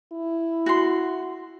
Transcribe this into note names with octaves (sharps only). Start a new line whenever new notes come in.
E4
F#4 C6